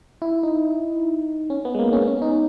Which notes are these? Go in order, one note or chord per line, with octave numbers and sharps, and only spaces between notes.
E4
D#4
C#4
B3
G#3
A#3
C#4
B3
C#4
D#4